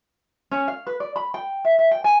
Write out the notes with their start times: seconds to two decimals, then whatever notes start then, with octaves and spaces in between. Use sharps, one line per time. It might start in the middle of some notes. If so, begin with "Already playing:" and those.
0.51 C#4
0.68 F5
0.87 B4
1.00 D5
1.16 B5
1.34 G5
1.65 E5
1.79 E5
1.91 G5
2.04 G#5